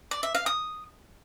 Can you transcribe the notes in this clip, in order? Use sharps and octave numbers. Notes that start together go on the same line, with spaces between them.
D5
E5
F5
D#6